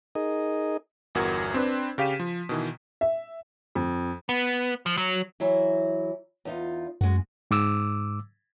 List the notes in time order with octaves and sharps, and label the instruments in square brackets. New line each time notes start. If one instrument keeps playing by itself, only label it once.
[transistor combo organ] D#4 G#4 A#4 D#5
[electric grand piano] G1 E2 F#4 A#4 G#6
C4 D4 B4
C#3 G4 F5 B6 D#7 E7
F3
B2 D#3 E3
[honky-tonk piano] E5
[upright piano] F2
[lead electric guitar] B3
F3
F#3
[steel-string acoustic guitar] E3 F#3 E4
E2 D#4 F4
[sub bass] F#2 [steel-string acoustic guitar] G#3 F#4
[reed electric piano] G#2 D6 E6